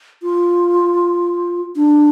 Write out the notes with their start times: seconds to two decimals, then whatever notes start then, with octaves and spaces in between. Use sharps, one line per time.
0.23 F4
1.76 D4